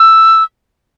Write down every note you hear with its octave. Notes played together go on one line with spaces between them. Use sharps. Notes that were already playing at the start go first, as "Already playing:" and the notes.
Already playing: E6